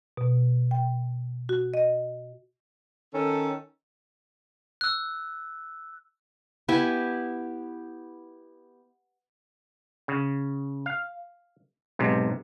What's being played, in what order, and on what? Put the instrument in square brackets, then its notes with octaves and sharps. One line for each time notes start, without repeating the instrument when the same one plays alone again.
[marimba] B2
G5
F#4
D#5
[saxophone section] D#3 C#4 A4
[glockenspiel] E6 F#6
[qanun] B3 E4 G4 G#5
[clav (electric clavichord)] C#3
F5
B1 G#2 C3